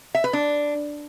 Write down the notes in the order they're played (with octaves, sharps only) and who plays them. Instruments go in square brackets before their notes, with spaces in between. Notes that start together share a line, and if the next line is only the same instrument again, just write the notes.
[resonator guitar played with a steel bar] E5
B4
D4